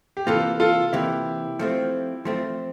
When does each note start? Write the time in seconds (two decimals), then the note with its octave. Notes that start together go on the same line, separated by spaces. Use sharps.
0.17 G4
0.27 C3 E3 A#3 F4 A4
0.60 F4 A4
0.93 C3 E3 A#3 E4 G4
1.59 F3 A3 C4
2.25 F3 A3 C4